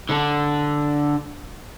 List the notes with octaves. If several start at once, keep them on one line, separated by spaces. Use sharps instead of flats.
D3 D4